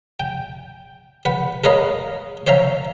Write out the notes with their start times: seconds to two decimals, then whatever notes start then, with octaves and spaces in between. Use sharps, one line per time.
0.20 G5
1.25 B4 F#5
1.64 A#4 B4 C#5 D#5 F5 A#5
2.47 C5 C#5 E5 F5 A#5